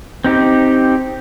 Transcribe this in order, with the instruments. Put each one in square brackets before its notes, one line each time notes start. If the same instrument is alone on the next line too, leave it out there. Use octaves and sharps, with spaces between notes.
[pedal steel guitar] C4 D#4 G4